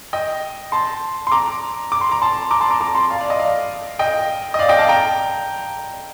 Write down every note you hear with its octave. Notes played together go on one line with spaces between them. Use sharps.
D#5 G5
A5 C6
C6
A#5 D6
D6
C6
A#5
A5 C6
A#5 D6
A5 C6
A#5 D6
A#5 D6
A5 C6
F5 A5
D5 F5
D#5
D5 F5
D#5 G5
D#5
D5 F5
D#5 G5
F5 A5
G5 A#5